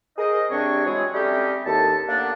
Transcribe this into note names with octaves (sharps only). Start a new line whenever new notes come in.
G#4 A#4 C5 D#5
C3 G3 C4 D4 C#5 C#6
E3 F#3 G#3 C4 G#4
G3 A3 C4 C#4 D#4 G4
D#2 A2 A4 A5
A#3 B3 D4